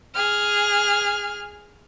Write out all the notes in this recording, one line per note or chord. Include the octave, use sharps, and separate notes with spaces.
G#4 F6